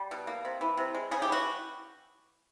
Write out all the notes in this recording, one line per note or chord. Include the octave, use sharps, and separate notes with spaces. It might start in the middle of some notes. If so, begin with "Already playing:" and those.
Already playing: G3
B2
A#3
C3
E3
C3
G#3
C#3 G#4
G4
E3 F#4